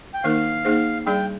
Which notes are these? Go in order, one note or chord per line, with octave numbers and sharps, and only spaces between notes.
G5
D#3 A#3 D#4 A#4 F5
A#3 D#4 G#4 C5
G3 D4 G#4 D5 G5